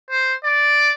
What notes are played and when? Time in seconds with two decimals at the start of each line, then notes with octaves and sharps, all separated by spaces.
0.10 C5
0.44 D5